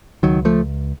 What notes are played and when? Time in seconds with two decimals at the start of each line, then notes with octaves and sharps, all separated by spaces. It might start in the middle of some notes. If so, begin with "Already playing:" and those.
0.23 C#2 D#3 F#3
0.45 F3 A3